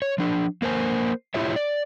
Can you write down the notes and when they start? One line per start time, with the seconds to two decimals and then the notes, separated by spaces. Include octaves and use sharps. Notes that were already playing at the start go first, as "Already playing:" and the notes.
0.02 C#5
0.18 F3 D4
0.62 A#3 A#4 C5 G#5
1.34 E4 F4 G4 C#5 E5
1.56 D5